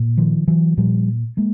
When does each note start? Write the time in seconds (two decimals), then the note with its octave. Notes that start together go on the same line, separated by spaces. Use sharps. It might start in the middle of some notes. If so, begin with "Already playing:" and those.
Already playing: A#2
0.17 D#3 F3
0.48 E3 F#3
0.77 A#2 F3 G3
1.37 G#3 A#3